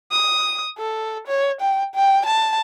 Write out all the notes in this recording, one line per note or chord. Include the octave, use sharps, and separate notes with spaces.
D#6
A4
C#5
G5
G5
A5